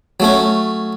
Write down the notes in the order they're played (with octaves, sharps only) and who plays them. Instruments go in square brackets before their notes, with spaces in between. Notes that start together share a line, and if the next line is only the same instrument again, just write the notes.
[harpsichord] F#3 A3 C#4